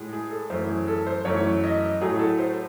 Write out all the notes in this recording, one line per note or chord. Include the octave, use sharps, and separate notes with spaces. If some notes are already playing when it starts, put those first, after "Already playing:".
Already playing: A2 G#3
G#4
A4
F#2 E3 A3 C5
G#4
A4
C5
F#2 E3 A3 C#5
D#5
A2 F#3 A3 G#4
A4
C5